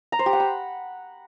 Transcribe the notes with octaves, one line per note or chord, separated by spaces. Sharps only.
A#5
C5
G4
F#5
B5